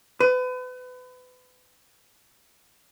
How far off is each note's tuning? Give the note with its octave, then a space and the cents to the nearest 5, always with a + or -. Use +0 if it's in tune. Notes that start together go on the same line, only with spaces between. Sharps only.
B4 +35